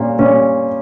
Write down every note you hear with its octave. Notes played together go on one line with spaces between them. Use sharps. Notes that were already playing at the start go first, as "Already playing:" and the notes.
Already playing: A#2 G3 C#4
A#2 G3 C#4